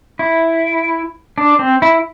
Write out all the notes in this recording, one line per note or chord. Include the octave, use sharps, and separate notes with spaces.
E4
D4
C4
E4